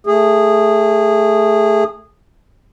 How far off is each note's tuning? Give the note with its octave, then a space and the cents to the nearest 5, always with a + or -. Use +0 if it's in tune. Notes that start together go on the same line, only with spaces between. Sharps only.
A3 +0 G#4 -15